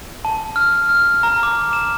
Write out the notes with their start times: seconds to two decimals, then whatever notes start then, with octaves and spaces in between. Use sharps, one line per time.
0.25 A5
0.56 F6
0.89 F6
1.23 A#5
1.43 D6
1.73 E7